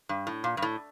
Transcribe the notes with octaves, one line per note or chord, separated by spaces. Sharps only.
G2
A2
A#2
G2
A2